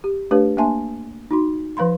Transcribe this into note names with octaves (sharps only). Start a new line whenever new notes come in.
G4
A3 D4 G4 B4 C#5 F5
A#3 D4 E5 G#5 A5 C6
D#4 F#4 C6
F3 B4 F5 B5 C6